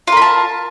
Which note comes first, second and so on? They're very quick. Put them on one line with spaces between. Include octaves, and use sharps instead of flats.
F4 A#4 B5 A5